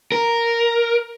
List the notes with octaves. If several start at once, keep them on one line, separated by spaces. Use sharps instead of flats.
A#4